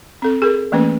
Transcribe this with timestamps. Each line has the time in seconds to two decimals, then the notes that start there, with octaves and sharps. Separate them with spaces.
0.22 C4 A4
0.42 G#4 A#4
0.72 E3 A3 A#3 C#4 B4